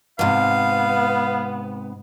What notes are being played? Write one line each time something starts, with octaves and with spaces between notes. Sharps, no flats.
G#2 C3 B3 F5